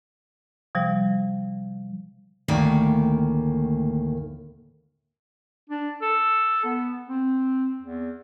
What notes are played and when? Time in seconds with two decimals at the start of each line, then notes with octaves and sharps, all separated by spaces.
0.75 C3 F3 G3
2.48 D2 A2 D#3 A#3
5.70 D4
6.02 A4
6.64 B3
7.09 C4
7.82 E2